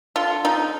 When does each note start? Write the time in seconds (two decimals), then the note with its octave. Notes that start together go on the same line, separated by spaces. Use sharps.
0.16 D3 F4
0.45 F3 D#4